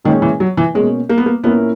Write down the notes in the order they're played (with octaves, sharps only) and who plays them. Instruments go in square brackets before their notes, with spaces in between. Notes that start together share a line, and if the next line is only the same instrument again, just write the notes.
[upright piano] A#2 G#3 C#4 G#4 [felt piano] D#3
[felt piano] E3
F#3
E3
[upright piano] B2 A#3 C#4 [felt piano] G#3
[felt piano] A#3
B3
A#3
[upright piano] A#2 A#3 C#4 E4 A#4 [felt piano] B3